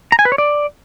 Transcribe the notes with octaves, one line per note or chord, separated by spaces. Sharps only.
A#5
G#5
B4
C#5
D5